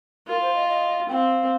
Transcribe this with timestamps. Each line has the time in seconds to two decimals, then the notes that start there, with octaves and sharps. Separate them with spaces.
0.27 F4 A#4
0.41 C5
0.54 D#5
0.68 D#5
1.08 C4 F5 G5